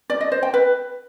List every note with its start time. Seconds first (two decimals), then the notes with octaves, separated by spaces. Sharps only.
0.10 D5
0.21 D#5
0.32 C5
0.43 G5
0.54 B4